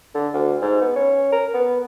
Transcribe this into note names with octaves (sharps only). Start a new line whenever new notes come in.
D3
D2
G#2
B3
C#4
A#4
B3